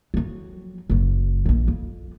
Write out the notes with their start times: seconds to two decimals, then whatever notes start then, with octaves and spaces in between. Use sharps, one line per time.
0.14 F2 F#3
0.90 F#1 F#3
1.46 A#1 E3
1.68 F2